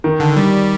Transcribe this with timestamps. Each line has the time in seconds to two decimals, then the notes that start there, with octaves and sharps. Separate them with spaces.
0.04 D#3
0.20 D3
0.36 G3